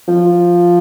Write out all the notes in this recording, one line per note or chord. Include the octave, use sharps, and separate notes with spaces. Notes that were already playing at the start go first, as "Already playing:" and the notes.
F3